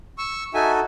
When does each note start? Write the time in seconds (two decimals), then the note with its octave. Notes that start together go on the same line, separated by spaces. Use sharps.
0.18 C#6 E6
0.54 D#4 F#4 A4 E5 G#5